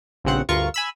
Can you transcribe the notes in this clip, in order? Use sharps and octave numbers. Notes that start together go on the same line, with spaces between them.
A#1 G2 C#3 C4 F#5
D2 G2 F4 A#4 C#6
G#5 B5 E6